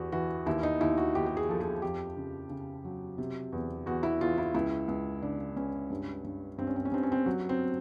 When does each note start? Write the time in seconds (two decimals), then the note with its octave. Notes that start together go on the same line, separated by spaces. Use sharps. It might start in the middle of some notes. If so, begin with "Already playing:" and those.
Already playing: E2 F#4 G4
0.12 E3 F#4
0.46 D#2 E4
0.63 D#4
0.81 D#2 E4
0.98 F#4
1.15 D#2 G4
1.26 G4
1.37 G#4
1.49 F3 A4
1.61 G#4
1.82 F2 G4
2.17 C#3
2.50 C#3
2.85 F#3
3.18 C3
3.52 E2
3.86 E2 F#4
4.03 E4
4.21 E2 F4
4.38 E4
4.54 C#2 E4
4.88 C#2
5.22 C#3 D4
5.56 C#2 C#4
5.90 G2
6.24 G2
6.58 G2 C4
6.67 C#4
6.76 C4
6.85 C#4
6.92 G2 C4
7.03 C#4
7.12 C4
7.26 F#3
7.49 C4